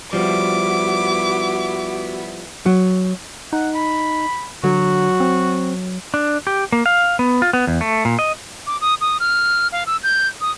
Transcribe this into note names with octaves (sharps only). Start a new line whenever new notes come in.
F3 G3 B3 E4 F#4 D6
F#3
D#4 F#5
B5
D3 F#3 F#4
C4
D4
G4
A#3
F5
B3
F4
B3
E2
A3
A#2
D#5
D6
D#6
D#6
F6
F5
E6
G6
D#6